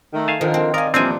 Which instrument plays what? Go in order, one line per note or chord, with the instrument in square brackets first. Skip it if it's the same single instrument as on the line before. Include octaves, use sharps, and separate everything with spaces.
[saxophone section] D#3 A3
[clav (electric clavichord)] F5 G#5 A5
[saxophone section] D3 F3 A#4 [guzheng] D#3
[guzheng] C4
[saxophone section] D#3 D#5 F5 [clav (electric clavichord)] A#4 [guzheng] D5 G#5
[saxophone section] A#2 E3 G3 [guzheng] F3 D4 F4 [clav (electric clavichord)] C4 G#5